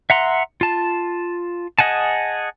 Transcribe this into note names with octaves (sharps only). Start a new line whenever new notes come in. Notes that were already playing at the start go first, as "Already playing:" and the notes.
E5 F#5 A#5 C6
F4 A5
G#4 D#5 F#5 G#5 A5